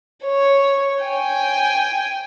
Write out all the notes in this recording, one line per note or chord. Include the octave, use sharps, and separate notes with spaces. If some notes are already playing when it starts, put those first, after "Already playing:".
C#5
G5 G#5